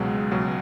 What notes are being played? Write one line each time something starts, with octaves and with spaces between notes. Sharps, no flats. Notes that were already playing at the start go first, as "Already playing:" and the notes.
Already playing: C#2 B2 F#3 G#3
C#2 B2 F#3